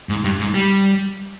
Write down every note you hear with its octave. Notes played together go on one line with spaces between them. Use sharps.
G#2
G2
G#2
G3